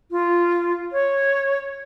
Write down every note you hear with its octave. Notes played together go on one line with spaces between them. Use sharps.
F4
C#5